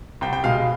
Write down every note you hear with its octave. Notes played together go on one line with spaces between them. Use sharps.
C2 G5
G5
B2 G#3 F5